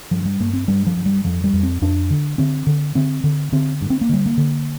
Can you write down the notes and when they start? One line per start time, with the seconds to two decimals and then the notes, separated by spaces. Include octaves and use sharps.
0.11 G2 F3
0.25 G3
0.40 G2 A#3
0.53 C4
0.68 G2 G3
0.87 F3
0.96 G2
1.06 G3
1.25 F2 F3
1.44 G3
1.53 F2
1.63 C4
1.82 F2 D4
2.10 D3
2.38 D3 C4
2.67 D3
2.95 D3 C4
3.24 D3
3.52 D3 C4
3.81 G2
3.90 C4
4.01 A#3
4.09 D3 G3
4.26 A#3
4.38 D3